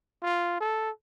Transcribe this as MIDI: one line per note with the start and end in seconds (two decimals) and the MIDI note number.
0.22 0.61 65
0.61 0.90 69